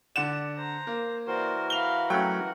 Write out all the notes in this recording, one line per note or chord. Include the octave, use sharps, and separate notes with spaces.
D3 D5 F#5 E7
C5 A#5
A#3
E3 F#4 A#4 C5 D5
F5 B5 F7 G7
F#3 A3 C#4 F#5 G5